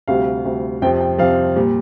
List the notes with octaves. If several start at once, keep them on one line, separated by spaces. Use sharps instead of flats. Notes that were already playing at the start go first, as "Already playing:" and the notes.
D2 C3 G3 F5
D2 C3 G3
F2 C3 F3 G5
G5
F2 C3 F3 F5
A#2 G3